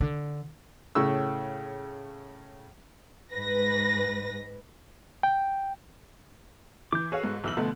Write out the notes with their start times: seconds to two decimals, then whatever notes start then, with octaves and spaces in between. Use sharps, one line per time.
0.01 D3
0.95 A2 C#3 C#6 E6
3.34 G#2 B4 A#6
5.23 G5
6.92 E3 D6 G6
7.12 F#4 G#4 A4 B4 C#5 F5
7.23 G#2
7.44 B1 E3 E6 F#7
7.57 B2 D3 F3 A3